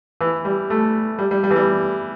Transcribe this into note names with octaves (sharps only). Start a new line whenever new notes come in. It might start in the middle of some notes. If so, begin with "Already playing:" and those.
E3
G3
A3
G3
G3
G3
E3
G3